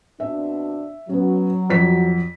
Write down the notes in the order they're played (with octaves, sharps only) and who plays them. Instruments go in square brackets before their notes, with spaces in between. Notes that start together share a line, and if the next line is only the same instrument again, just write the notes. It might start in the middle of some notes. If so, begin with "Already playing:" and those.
[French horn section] B2 C4 D4 [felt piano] E5
[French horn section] F#3 [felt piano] B3 C#4
[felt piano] F2 C#5 B6